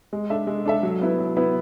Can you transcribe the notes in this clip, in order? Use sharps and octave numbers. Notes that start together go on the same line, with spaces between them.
G#3
D4 A4 E5
G#3
D4 A4 E5
F#3
B3 E4 B4
F#3
B3 E4 B4